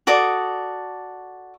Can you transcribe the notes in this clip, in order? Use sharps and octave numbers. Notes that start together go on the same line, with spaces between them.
F#4 A4 D5 D#6